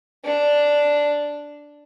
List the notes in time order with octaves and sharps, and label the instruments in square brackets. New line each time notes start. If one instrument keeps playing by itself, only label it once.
[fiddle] D4